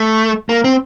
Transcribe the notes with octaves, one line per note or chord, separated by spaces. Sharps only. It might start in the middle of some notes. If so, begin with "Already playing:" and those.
Already playing: A3
A#3
C4